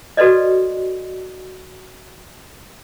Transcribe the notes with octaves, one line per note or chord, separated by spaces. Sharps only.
F#4 A4 B4 D5 D#5